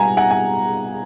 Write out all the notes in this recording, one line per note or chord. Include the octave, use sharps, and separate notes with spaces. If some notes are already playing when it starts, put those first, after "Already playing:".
Already playing: B2 G3 B3 F#5 G#5 A#5
F#5 G#5
G#5